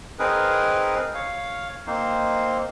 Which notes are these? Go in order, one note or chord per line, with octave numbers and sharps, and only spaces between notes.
C4 D#4 G#4 A#4 B4
C#5 F5
A#3 C4 D#4 C5